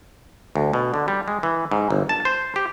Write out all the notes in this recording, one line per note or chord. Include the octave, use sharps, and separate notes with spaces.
D2
B2
D3
G3
G#3
E3
G#2
G1
A5
C5
G4